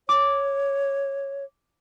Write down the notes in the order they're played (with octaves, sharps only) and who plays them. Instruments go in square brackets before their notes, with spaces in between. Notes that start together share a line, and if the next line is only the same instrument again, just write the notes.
[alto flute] C#5 [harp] D6